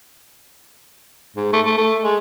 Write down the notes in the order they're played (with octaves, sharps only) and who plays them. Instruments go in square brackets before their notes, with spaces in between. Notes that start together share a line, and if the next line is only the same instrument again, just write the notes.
[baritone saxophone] G#2
A3
A3
A3
G#3